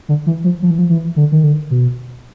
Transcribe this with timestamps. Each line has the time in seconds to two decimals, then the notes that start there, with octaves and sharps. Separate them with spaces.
0.09 D3
0.26 E3
0.44 F3
0.62 F3
0.70 E3
0.78 F3
0.89 E3
1.16 D3
1.32 D#3
1.44 D3
1.70 B2